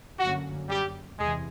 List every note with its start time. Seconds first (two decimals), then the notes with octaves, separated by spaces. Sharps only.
0.19 F#2 D3 F#3 A#3 C#4 F#4
0.69 G3 G4
1.18 E2 C3 E3 G#3 G#4